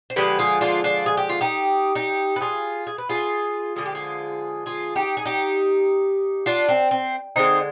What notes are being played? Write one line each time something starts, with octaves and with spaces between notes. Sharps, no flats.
C5
D3 F3 G#3 G4 B4
F4 G#4
D4 F4
D4 F4
G#4
G4
F4
D#4 G4
D#4 G4
B4
F4 G#4
G#4
B4
F4 G#4
D3 F3 G#3 G#4
G4
F4 G#4
F4 G#4
D#4 G4
G#4
D#4 G4
D4 F4
C4
C4
D3 G#3 C4 D#4